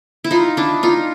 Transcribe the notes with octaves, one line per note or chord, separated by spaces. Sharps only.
E4
D#4 F4
D4 E4
D#4 F4